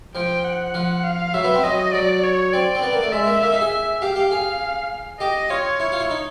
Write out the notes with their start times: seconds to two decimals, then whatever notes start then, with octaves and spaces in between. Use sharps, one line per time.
0.15 F3 G5
0.45 F#5
0.74 F3
1.04 F5
1.34 F#3 E5
1.44 B3
1.54 C4
1.64 F#3 D#5
1.94 F#3 D5
2.23 C#5
2.53 C4 D5
2.75 C4
2.82 B3 D5
2.93 A#3
3.02 A3
3.12 G#3 E5
3.26 A#3
3.42 A#3
3.52 D#4
3.61 G#4
3.72 E5
4.02 G4 F5
4.16 G4
4.31 G#4
5.20 G4 D#5
5.49 F4 C#5
5.80 E4
5.92 F4
6.00 E4
6.10 D#4